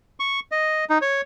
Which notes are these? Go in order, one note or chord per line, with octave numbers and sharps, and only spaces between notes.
C#6
D#5
D#4
C#5